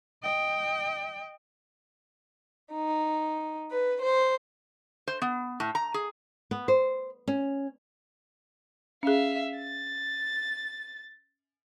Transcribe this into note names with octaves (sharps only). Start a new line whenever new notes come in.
D#5 G5
D#4
B4
C5
C5
B3
A2
A#5
G#4
B3
C5
C#4
C#4 G#4 E5 F5
A6